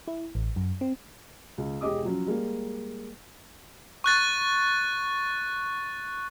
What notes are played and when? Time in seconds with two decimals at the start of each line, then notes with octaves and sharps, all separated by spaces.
0.08 E4
0.35 A1
0.56 F#2
0.81 C4
1.58 C#2
1.81 E1 G4 G#4 D#5 D6 D#6
2.03 F3 F#3 C#4
2.27 G3 G#3 A#3
4.04 C#6 F#6 A6